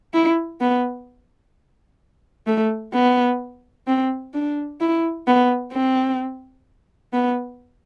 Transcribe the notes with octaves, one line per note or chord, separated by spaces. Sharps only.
E4
B3
A3
B3
C4
D4
E4
B3
C4
B3